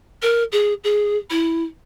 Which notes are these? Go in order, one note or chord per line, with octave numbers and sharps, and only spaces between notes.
A#4
G#4
G#4
E4